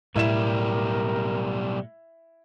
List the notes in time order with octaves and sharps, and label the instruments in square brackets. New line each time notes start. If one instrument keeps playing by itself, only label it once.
[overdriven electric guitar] B1 G3 [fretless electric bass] A2 [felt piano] E4 E5 E7 [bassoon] A#4